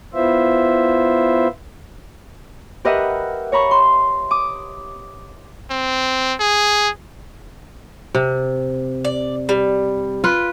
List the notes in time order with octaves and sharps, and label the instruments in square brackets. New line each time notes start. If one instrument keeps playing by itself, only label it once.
[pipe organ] B3 E4 F4 C5 E5
[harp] G4 A#4 B4 D#5 E5 F#5
C#5 A#5 B5 C#6
C6
D6 D#6
[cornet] C4
G#4
[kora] C3
[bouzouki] D5
G3
[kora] F4 B4